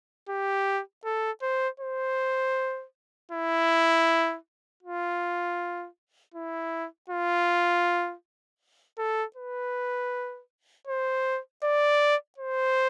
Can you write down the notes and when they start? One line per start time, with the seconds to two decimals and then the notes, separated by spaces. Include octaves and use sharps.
0.29 G4
1.05 A4
1.42 C5
1.80 C5
3.32 E4
4.83 F4
6.34 E4
7.10 F4
8.98 A4
9.36 B4
10.87 C5
11.63 D5
12.38 C5